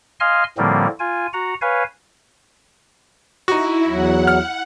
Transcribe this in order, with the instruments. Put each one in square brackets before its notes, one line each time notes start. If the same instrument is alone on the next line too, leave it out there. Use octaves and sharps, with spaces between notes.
[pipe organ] D#5 F5 G#5 C6 F6
A2 D3 F3 G3 A#3 C4
F4 G#5
F#4 F#5 A#5
B4 C#5 F5 G#5
[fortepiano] D#4 F#4 [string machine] E4
[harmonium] E2 F#3 [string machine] F#5
[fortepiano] F6